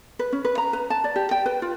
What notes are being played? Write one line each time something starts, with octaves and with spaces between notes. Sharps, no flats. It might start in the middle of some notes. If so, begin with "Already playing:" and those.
B4
C#4
B4
A#5
B4
A5
D5
G4
G5
B4
F4